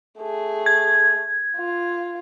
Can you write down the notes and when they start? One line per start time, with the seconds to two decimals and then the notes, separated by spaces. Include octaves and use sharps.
0.20 A3 G#4
0.66 G#6
1.57 F4